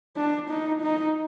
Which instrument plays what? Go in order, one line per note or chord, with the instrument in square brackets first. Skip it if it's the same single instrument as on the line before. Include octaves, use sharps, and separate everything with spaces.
[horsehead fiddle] D4
D#4
D#4